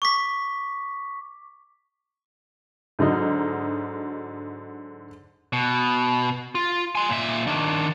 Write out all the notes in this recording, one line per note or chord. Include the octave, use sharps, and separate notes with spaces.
C#6 D6 B6
G#2 D3 F#3 D#4
B2
F4
G#5 C6
A#2 E5
D#3 D4